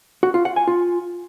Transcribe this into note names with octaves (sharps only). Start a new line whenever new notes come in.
F#4
F4
F#5
G#5
F4